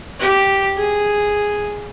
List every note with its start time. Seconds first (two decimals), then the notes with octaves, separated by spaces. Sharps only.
0.19 G4
0.77 G#4